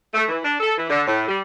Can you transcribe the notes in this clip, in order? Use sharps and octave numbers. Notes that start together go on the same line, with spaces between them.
A3
E3
D4
A4
E3
D3
A2
G3